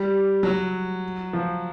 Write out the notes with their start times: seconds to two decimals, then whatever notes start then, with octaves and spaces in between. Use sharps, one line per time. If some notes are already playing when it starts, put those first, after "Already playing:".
Already playing: G3
0.43 F#3
1.33 F3